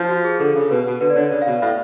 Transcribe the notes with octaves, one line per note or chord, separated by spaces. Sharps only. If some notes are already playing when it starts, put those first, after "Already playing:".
Already playing: F3
F#4
G#4
D3 A4
C#3 A4
B2 B4
B2
D3 B4
D5
D3 C#5
C#3 D5
F5
B2
A2 F5